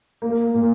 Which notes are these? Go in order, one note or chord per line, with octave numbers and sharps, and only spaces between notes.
A#3
A#2